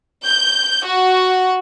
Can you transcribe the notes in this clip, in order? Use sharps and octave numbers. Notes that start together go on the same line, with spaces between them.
G6
F#4